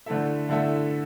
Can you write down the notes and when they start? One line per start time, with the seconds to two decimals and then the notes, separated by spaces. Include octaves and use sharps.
0.06 D3 A3 E4 A4 E5
0.49 D3 A3 E4 A4 E5